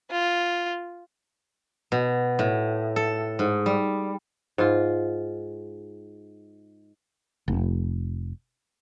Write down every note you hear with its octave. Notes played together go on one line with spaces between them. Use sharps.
F4
B2
A2
A4
G#2
G3
G#2 F4
F1